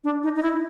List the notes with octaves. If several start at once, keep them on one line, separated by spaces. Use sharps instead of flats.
D4
D#4
D#4
E4